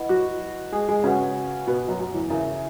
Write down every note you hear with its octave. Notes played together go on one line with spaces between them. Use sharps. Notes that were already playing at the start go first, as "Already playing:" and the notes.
Already playing: E4 B4 D#5 F#5 B5
F#3 F#4
G#3 G#4
G#3 G#4
C#3 C#4 F#4 B4 F#5
B2 B3
F#2 F#3
F#2 F#3
E2 E3
C#3 E4 A#4 E5